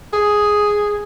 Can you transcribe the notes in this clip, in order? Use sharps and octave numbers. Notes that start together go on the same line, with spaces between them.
G#4